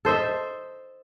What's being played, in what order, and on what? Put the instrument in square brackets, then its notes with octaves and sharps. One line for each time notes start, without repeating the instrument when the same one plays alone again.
[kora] A4 C5 D#5 E5